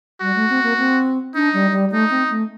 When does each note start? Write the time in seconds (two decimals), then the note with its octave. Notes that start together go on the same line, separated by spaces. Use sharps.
0.21 G3 F#4
0.35 A3
0.50 C4
0.63 A#3
0.78 C4
1.35 D4 D#4
1.53 G3
1.72 G3
1.91 A3 D#4
2.10 C4
2.30 A3